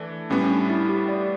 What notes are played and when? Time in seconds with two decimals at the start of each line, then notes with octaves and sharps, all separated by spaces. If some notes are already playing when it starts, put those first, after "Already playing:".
Already playing: E3 A3 D4
0.30 A2 G3 B3 C#4
0.43 C#4
0.50 D4
0.70 E4
0.89 G4
1.09 D5